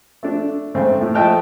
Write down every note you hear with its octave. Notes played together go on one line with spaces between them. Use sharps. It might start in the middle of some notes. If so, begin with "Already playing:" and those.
A3 D4
G#2 C#3 A3 C4
A2
F3 A3 D#5 G5 A5 F6